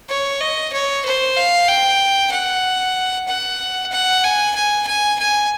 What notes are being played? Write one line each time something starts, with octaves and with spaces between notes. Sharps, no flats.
C#5
D#5
C#5
C5
F5
G5
F#5
F#5
F#5
G#5
G#5
G#5
G#5